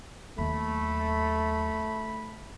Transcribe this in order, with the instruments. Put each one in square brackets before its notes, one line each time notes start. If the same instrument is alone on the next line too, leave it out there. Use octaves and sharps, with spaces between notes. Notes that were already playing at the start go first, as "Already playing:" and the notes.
[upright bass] D#2 F#3 [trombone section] A3 [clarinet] B5